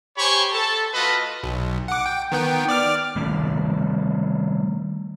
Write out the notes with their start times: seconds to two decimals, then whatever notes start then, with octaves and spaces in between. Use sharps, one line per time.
0.18 G4 C5 C#5 G#5 B5 C#6
0.52 A4 A5
0.94 A3 F4 F#4 A4 B4 D#5
1.43 B1
1.88 F#5 D6
2.06 G5
2.32 D#3 B3 G5
2.69 D5 D6 F6
3.16 D#3 G3 A3 C#4